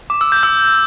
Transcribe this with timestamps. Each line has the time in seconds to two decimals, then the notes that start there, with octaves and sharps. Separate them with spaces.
0.10 D6
0.21 E6
0.32 G6
0.43 E6